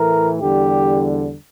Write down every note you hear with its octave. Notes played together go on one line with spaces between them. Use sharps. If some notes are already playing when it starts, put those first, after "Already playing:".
Already playing: A2 E3 A3 A#4
E2 D3 G3 G4